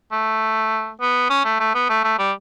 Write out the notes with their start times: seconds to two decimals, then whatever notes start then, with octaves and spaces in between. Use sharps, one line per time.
0.12 A3
1.00 B3
1.30 C#4
1.45 A3
1.60 A3
1.74 B3
1.89 A3
2.04 A3
2.19 G3